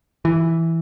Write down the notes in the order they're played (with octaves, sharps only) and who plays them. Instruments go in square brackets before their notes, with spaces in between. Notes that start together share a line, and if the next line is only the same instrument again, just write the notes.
[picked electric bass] E3